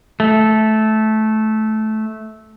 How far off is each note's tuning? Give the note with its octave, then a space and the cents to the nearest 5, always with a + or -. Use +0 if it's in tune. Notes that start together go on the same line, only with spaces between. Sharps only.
A3 -15